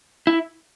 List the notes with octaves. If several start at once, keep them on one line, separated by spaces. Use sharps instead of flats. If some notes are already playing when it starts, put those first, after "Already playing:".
E4